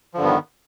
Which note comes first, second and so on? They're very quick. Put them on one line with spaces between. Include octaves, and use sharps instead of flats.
F3 D3 G2 B3 D#3